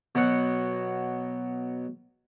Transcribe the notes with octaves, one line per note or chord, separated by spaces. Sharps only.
B2 F#3 F#5